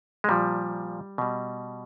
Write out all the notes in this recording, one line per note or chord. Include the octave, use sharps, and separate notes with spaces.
G#3
A#2 F3 G3
B2 G3